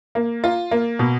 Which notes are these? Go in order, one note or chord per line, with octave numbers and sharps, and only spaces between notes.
A#3
F4
A#3
B2